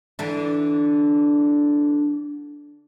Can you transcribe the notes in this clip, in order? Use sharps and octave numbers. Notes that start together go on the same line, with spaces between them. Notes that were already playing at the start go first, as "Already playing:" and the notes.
D3 E3 D4